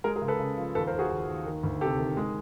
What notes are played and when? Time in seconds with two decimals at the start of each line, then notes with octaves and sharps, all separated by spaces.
0.04 G#3 G#4 A#4
0.16 G#4 A#4
0.22 C#2
0.28 A4 B4
0.40 C#3
0.57 F3
0.75 D#2 A4 B4
0.87 A#4 C5
0.93 D#2
0.99 F#4 G#4
1.10 D#2
1.28 D#2
1.45 D#3
1.63 D2
1.81 C3 G4 A4
1.99 D#3
2.17 G#3